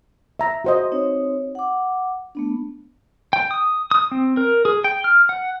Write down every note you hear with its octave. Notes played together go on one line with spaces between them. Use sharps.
E5 A#5
F#4 C5 D#5
C4 D#4 C#5
F#5 D6
A3 B3 D4
G5
D#6
D#6
C4
A#4
G#4
G5
F6
F#5